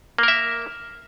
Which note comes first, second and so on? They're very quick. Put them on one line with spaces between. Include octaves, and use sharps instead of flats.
A#3 A#4 E5